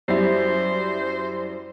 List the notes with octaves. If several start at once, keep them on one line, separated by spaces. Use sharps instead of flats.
F#2 G3 E4 C5